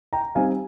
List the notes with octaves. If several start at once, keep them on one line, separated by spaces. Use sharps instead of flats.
G5 A#5
G3 C4 D#4 F5 G#5